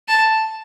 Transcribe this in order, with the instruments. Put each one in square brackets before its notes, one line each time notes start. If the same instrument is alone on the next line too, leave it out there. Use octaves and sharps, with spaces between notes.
[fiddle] A5